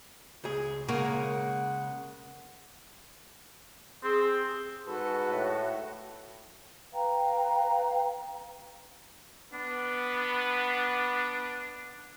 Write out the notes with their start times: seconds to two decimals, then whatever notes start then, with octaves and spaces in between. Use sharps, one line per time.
0.44 C#2 G#4
0.89 C#3 G#3 A#3 A#4 F#5
4.03 C4 G#4
4.87 G#2 F#4 A4 B4
5.31 A2
6.93 B4 F5 G5 A#5
9.53 B3 D4